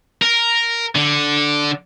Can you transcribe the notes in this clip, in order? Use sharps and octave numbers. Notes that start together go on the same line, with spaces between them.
A#4
D3